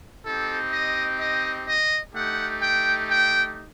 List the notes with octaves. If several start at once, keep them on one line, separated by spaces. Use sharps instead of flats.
C4 D#4 G4 A4
D#5
D#5
D#5
A3 D#4 G4 F#5
G5
G5